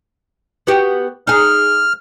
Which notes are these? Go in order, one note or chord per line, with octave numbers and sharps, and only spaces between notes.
B3 F#4 G4
D#4 G#4 F6